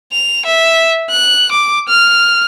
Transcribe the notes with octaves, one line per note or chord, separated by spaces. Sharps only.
F7
E5
F#6
D6
F6